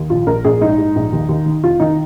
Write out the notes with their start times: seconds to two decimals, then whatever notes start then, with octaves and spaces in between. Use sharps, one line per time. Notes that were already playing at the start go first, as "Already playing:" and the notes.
Already playing: D#2
0.10 A#1 F4
0.27 A#1 A#4
0.45 A#1 G#4
0.61 G#2 D#4
0.78 G#2
0.96 A#1
1.13 D#2
1.29 D#2
1.46 D#3
1.63 F1 F4
1.80 D#3 D#4